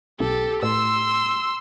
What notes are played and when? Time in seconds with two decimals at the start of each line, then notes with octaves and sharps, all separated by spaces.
0.20 B1 G4 A4
0.63 A2 C6 E6